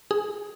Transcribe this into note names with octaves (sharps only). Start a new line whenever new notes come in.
G#4